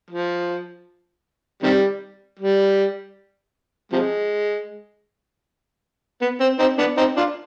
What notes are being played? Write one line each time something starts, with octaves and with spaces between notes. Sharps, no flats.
F3
C3 D#3 G3
G3
C3 F3 G#3
B3
C4
C4 D#4
B3 D4
C4 D#4
D4 F4